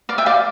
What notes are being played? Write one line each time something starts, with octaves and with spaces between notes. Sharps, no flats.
D5 F5
E5 G5
D5 F5